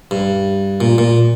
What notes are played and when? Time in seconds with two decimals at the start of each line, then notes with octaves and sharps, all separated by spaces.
0.11 G2
0.81 A#2
0.98 A#2